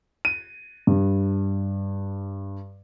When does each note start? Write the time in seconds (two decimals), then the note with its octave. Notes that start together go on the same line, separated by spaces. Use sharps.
0.25 D#7
0.87 G2